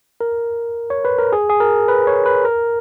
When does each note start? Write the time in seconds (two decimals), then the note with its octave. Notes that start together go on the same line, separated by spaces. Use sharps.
0.21 A#4
0.90 C#5
1.05 B4
1.19 A#4
1.32 G#4
1.50 G#4
1.60 A#4
1.88 B4
2.07 C#5
2.26 B4
2.44 A#4